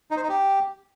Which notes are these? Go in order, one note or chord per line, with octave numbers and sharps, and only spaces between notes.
D#4
C5
D#4
G4